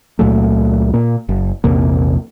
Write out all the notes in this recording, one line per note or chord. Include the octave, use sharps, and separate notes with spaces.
C#2 A#2 F#3 A3
A#2 A#3
F#1
A#1 E2 C3 A#3